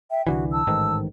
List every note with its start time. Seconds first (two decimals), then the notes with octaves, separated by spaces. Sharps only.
0.10 E5 G5
0.27 C2 D3 E3 F#4
0.52 A5 E6
0.67 A1 G#2 D#3